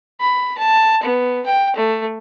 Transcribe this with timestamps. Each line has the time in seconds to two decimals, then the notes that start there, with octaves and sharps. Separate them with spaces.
0.20 B5
0.58 A5
1.03 B3
1.46 G5
1.76 A3